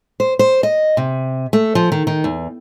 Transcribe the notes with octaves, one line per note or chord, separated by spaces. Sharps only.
C5
C5
D#5
C3
A3
F3
D#3
D#3
E2